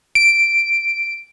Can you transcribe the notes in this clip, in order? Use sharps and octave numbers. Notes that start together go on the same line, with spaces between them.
D7